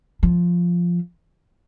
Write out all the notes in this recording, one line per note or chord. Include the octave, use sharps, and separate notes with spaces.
F3